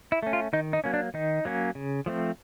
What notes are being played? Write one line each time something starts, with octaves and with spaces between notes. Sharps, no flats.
E4
A3 C#4
F4
D#3 D#4
D#4
F#3 A#3 C#4
D4
D#3 D#4
F#3 A#3 C#4
C#3
F3 A3 C4